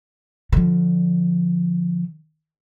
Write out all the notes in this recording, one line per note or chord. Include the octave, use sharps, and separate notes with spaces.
D3 F3